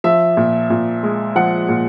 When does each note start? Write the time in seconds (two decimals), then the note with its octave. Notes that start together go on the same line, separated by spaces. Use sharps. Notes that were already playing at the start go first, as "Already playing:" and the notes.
0.04 F3 E5
0.37 A#2
0.70 A#2
1.03 G#3
1.36 F3 F#5
1.69 A#2